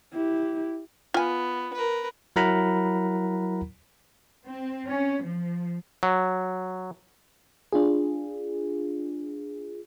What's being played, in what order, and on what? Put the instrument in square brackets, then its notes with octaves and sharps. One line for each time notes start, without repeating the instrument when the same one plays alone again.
[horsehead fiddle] E4 G4
[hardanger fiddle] B3 [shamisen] F4 G#5
[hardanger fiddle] A#4 B4
[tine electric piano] F#3 E4 A#4 F#5 A#5 B5
[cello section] C4
C#4
F3
[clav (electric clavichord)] F#3
[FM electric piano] D4 F4 G#4